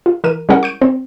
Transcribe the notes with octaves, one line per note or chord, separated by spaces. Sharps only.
F4
E3 A#4 D#7
G3 G#3 C#4 E4 A#4 F#5
C#6 G6 D7
C4 C5